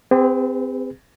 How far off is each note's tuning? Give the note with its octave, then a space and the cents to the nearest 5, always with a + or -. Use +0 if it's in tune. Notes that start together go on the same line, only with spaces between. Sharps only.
C4 -20 G#4 -45 B4 +25